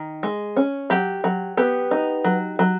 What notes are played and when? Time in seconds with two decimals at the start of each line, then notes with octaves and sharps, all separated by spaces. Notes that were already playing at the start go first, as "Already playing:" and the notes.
Already playing: D#3
0.23 G#3
0.56 C#4
0.90 F#3 G4
1.24 F#3
1.57 B3 G4
1.91 D#4
2.24 F#3
2.59 F#3